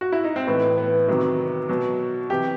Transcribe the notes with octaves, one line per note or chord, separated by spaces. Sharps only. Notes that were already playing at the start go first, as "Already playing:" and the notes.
F#4
E4
D#4
C4
A2 E3 B3
B3
C3 D#3 F#3
B2 F#3
C3 E3 G4